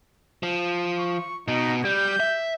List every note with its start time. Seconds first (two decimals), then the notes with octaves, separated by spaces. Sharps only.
0.43 F3
0.98 C#6
1.48 B2 D#4
1.85 G3 G6
2.20 E5